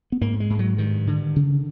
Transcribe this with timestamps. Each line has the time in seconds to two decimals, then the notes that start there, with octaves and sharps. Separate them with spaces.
0.12 B3
0.21 G#2 A#3
0.40 G#3
0.50 G#2
0.59 F#3
0.78 G2 D#3
1.07 D3
1.36 C#3